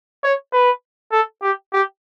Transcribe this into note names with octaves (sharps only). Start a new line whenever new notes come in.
C#5
B4
A4
G4
G4